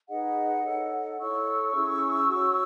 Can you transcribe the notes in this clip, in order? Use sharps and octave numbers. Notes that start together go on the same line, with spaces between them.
D#4 G#4 B4 D#5 F#5
D#4 A4 C#5
E4 A4 C#5 C#6 E6
C#4 E4 G#4
F#4 C#5